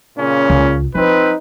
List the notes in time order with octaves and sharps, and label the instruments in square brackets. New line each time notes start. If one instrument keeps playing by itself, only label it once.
[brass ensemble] A#2 C#3 C#4
[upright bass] C#2
[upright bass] F3 [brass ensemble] C4 D#4 B4